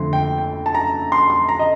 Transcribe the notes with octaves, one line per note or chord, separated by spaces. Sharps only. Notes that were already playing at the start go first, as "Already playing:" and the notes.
Already playing: F2 D3 A3 C6
G5
G5
A5
A#5
C6
C6
A#5
D#5